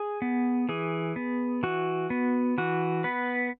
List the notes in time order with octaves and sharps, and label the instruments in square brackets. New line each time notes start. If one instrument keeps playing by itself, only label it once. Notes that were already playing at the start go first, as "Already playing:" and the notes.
Already playing: [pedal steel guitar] G#4
B3
E3 G#4
B3
E3 F#4
B3
E3 F#4
B3 B4